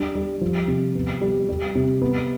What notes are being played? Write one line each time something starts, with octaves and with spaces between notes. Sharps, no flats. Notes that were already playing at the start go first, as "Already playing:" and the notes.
Already playing: G3 D4
G3
F3
C3
B3
G3
G3
C3
B3